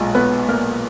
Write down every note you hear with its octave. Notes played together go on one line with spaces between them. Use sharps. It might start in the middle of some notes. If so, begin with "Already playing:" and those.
Already playing: B1 A#2 G#3 D#5
B3 B4
A#3 A#4